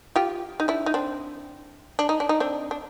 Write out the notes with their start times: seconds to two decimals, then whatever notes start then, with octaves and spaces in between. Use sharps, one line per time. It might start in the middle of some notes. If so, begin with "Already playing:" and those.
0.16 F4 G4
0.60 D#4
0.68 D4 E4
0.86 D#4
0.94 C4 D4
1.99 D4
2.09 D#4
2.20 D4
2.29 D#4
2.40 C4 D4
2.71 D4